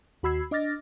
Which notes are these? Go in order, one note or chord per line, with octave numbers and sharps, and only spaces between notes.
D#2 F#4 B5 E6 G#6 C7
D4 D#5 D6 F6 A6 A#6